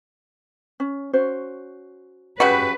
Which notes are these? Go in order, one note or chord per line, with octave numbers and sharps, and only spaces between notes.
C#4
C#4 F#4 C5
C#3 F#3 F#4 G4 B4 B5